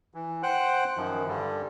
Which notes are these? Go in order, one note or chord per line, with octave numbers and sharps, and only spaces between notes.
E3
C5 F#5 G5 F#6
F#2 D#3 F3
G2 D3 G3